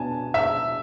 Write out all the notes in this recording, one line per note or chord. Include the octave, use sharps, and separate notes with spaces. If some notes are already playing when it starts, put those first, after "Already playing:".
Already playing: B2 B3 D4 G#5 A5
E5